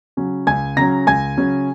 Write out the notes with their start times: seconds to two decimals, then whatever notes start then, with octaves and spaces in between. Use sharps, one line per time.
0.17 C#3 F#3 C#4
0.47 C#2 G#5 G#6
0.77 C#3 F#3 C#4 A#5 A#6
1.07 C#2 G#5 G#6
1.37 C#3 F#3 C#4